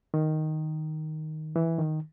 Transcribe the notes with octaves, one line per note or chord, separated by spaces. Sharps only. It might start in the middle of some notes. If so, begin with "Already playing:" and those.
D#3
E3
D#3